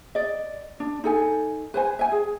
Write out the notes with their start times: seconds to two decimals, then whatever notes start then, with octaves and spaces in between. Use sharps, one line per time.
0.15 D5 D#5
0.80 D4
1.04 D#4 A4 G#5
1.74 B4 C5 G#5
1.99 E5 G#5
2.12 G#4